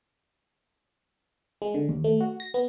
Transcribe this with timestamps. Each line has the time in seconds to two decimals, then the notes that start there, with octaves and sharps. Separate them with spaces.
1.62 G#3
1.74 D3
1.89 D#2
2.04 A3
2.20 F#4
2.40 A#6
2.54 B3